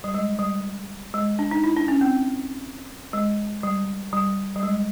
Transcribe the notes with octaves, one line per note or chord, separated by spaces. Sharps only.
G3
G#3
G3
G#3
D4
D#4
E4
D4
C#4
C4
G#3
G3
G3
G3
G#3